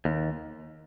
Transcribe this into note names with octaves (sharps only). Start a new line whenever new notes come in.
D#2